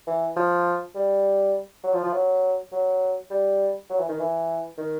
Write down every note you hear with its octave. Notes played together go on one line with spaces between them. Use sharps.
E3
F3
G3
F#3
F3
F3
F#3
F#3
G3
F#3
E3
D#3
E3
D#3